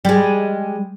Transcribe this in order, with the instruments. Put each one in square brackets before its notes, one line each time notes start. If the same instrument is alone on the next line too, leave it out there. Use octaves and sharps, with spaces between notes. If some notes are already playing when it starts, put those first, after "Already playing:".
[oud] G3 G#3